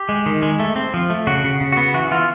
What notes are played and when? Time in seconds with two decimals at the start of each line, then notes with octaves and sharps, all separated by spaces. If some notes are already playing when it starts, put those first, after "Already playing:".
Already playing: G4
0.09 G#3
0.26 D#3
0.42 G#3
0.60 A3
0.76 C4
0.94 F3
1.10 A3
1.27 C#3 F#4
1.44 C#3
1.61 C#3
1.72 B3 F#4
1.94 E3 F#4
2.11 E3 F4